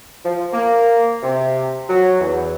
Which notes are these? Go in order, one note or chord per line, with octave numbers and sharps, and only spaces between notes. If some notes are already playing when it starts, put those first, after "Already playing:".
F3
A#3
C3
F#3
E2